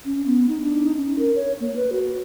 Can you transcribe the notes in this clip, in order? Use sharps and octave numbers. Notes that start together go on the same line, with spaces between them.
C#4
B3
D#4
D4
D#4
C#4
A#4
C#5
A#3
B4
F#4